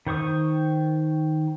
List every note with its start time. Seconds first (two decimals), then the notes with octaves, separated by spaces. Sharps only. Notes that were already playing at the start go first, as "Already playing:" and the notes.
0.07 D#3 C5 C#6 D#6